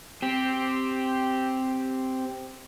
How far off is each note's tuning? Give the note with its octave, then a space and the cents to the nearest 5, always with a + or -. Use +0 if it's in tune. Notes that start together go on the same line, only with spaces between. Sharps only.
C4 +0 G4 +0